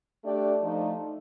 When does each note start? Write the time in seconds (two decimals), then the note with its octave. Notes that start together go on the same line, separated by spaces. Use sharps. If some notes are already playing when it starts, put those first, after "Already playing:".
0.23 A3 D4 G4 D5
0.61 F3 A3 D#4